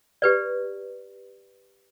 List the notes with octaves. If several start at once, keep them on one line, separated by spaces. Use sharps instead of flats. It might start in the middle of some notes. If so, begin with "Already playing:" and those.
G4 B4 D5